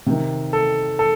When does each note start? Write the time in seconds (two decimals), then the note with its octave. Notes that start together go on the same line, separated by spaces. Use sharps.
0.06 C3 D#3
0.53 A4
0.99 A4